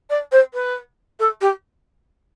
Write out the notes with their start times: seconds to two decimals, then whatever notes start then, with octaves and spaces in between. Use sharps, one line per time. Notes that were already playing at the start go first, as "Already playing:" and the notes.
0.10 D5
0.32 C5
0.54 B4
1.19 A4
1.41 G4